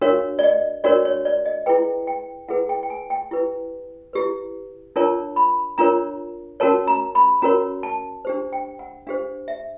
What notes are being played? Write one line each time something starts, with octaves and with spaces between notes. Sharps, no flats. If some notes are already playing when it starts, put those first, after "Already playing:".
D4 F#4 A#4 C#5 F5
D5
D#5
D4 F#4 A#4 C#5 D5
C#5
D5
D#5
E4 G#4 B4 G5
G5
E4 G#4 B4 F#5
G5
G5
G#5
G5
E4 G4 B4
E4 G4 B4
D4 F4 A#4 C#5 A5
B5
D4 F4 A#4 C#5 A#5
C#4 F#4 A#4 C#5 A5
A#5
B5
C#4 F#4 A#4 C#5 A#5
A5
D4 G4 C5
G5
F#5
D4 G4 C5 F5
E5